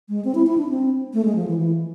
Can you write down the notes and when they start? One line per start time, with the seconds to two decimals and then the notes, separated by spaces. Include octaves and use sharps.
0.09 G#3
0.25 C4
0.35 E4
0.47 E4
0.58 D4
0.69 C4
1.14 A3
1.25 G#3
1.36 F3
1.48 E3
1.58 E3